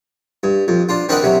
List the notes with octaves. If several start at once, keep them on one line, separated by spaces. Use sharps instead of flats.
G2
F2
D4 F4
C4 D4 A#4 B4 D#5 F#5
C3 F#3